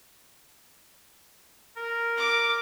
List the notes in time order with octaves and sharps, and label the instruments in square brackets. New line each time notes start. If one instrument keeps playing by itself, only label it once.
[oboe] A#4
[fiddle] D6